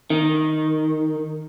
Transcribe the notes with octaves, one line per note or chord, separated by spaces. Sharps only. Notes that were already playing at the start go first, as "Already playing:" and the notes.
D#3